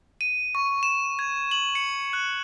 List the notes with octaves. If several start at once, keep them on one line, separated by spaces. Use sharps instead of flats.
D#7
C#6
E7
G#6
F#7
C#7
F#6